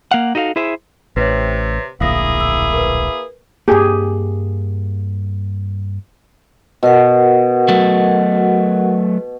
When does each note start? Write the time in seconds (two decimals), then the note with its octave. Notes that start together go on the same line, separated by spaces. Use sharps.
0.11 A#3 F5 F#5
0.35 D#4 F#4 A4 E5 F5
0.56 E4 G#4 C5 E5
1.16 A1 C3 B4 C#5
2.00 D1 A#1 A#3 E4 G#4 F5 D#6 A#6
2.40 E6
2.74 A#4 B4
3.68 G2 A#3 G4 G#4
6.83 B2 F#4 A#4 F#5
7.68 F#3 A3